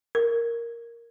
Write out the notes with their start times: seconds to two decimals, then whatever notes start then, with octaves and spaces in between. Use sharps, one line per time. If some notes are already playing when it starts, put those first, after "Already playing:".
0.15 A#4